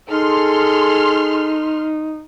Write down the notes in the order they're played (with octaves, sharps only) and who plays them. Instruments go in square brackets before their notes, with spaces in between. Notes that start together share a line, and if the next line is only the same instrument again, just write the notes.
[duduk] D#4 [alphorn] G#4 [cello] A4 [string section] C6 F6